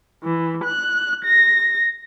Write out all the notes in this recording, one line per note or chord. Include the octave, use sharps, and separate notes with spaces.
E3
F#6
A#6